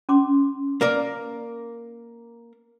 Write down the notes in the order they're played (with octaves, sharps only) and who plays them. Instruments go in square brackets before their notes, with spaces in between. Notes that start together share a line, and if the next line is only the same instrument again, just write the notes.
[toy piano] C#4 C6 D6
[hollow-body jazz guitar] A#3 A#4 D5